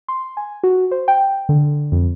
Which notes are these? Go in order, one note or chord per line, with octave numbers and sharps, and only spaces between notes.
C6
G#5
F#4
C5
G5
D3
F2